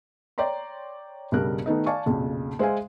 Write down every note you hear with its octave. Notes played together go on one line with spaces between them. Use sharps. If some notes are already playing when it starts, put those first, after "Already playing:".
C#5 D5 G5 A#5 C6
B1 G2 C#3 G3 A#4 F#6
D#3 A3 B3 D#4 A4 D#5
D5 F5 G#5 A5 C#6
B1 F2 A#2 C#3
G#3 C5 E5 F5 G#5